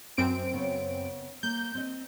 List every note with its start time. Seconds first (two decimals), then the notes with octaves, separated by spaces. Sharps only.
0.17 F#2 C4 D7
0.53 C#3 B3 C#5
1.43 A#3 G6
1.75 C4 D#5